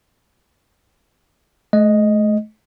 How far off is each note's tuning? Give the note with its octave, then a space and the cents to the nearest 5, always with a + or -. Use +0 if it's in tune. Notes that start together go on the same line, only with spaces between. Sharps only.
A3 -40 D#5 +0